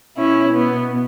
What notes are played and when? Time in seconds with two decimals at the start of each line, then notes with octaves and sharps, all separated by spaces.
0.17 B2 C#4 E4
0.52 B3